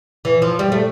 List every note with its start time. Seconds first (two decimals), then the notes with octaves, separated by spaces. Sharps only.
0.25 E3
0.42 F3
0.59 G3
0.72 A3